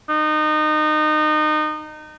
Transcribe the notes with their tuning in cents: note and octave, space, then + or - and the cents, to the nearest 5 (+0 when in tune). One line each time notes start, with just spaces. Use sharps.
D#4 -25